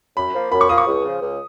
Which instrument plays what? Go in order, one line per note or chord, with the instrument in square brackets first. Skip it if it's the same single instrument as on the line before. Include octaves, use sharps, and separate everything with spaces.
[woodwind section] F#2 [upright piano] B5
[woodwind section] F3 A#3
[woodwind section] F#2 [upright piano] B5
[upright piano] C#6
[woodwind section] F3 A#3 [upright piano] D#6
[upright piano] C#6
[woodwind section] C#2
C#3 F3
C#2